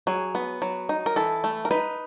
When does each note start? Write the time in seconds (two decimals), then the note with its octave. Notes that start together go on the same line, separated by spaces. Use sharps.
0.07 F#3 G#4
0.35 B3
0.62 F#3
0.89 D#4
1.06 A#4
1.16 E3 A4
1.44 A3
1.65 A#4
1.71 D#4 B4